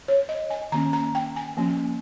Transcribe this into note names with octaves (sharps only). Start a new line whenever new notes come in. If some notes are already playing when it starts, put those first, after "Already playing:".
C#5
D#5
G#5
D#3 A#3 C#4 A#5
A#5
G5
G#5
F3 A#3 C#4